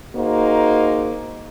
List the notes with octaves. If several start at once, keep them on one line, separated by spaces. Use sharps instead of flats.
A#3 D#4 F#4 G#4 C5